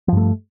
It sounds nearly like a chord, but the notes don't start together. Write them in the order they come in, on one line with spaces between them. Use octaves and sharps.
F3 G2 A3